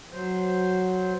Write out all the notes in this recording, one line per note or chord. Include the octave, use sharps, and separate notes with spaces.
F#3 C5